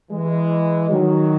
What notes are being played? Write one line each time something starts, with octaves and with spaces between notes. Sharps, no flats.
E3 G#3
D#3 F#3